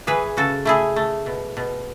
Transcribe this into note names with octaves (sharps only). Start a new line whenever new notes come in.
E3 G#4 B4
C#3 F#4 A4
A3 E4 G#4
A3
B2
B2